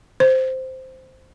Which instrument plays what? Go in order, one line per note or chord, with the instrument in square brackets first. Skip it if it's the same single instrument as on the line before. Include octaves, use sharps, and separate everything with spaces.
[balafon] C5